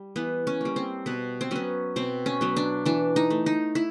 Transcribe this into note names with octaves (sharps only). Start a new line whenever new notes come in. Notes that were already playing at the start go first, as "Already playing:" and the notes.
Already playing: G3
E3 B3
C#4
G3 A#3
C4
B2 B3
C4
F#3 B3 C#4
B2 C4
C#4
F#3 B3
D4
E3 D4
D#4
A3
D#4
E4